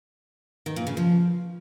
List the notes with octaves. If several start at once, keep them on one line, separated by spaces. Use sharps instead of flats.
D#3
A#2
C#3
F3